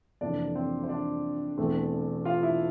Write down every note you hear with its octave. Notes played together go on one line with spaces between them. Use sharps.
F1 F2 E3 A#3 D4 D5
C4 C5
C5
D4 D5
E1 E2 E3 A3 C4
F4 F5
E4 E5